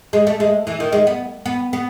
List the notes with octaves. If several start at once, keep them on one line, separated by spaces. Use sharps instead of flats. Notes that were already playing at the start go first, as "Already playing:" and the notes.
G#3
A3
G#3
E3
D#3
G#3
B3
B3
B3